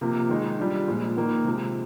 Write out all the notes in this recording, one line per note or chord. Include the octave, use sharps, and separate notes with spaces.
C3 F3 A#3
D#3 G#3 D#4
G3 D4 F4
A#2 F3 G#3
D#3 A#3 D#4
C3 F3 G#3